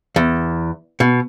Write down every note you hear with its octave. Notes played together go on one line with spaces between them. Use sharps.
E2
B2